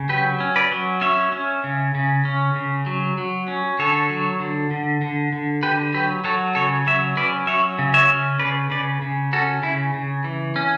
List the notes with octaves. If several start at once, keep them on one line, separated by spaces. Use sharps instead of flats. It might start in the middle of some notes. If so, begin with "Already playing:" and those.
Already playing: C#3
F#3 G4 B4
C#4
B4 D5
F#3
C#4 C#5 E5
C#4
C#3
C#3
C#4
C#3
F#3
F#3
C#4
D3 A4 C#5
F#3
D3
D3
D3
D3
D3 G4 B4
F#3 G4 B4
F#3 A4 C#5
C#3 A4 C#5
F#3 C#5 E5
C#4 B4 D5
F#3 C#5 E5
C#3
C#5 E5
C#4
C#3 B4 D5
C#3 B4 D5
C#3
C#4 F#4 A4
C#3 E4
C#3
E3
C#4